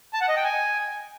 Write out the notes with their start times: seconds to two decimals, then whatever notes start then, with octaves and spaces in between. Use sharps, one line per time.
0.13 A5
0.21 F#5
0.29 D#5
0.36 G5
0.44 G#5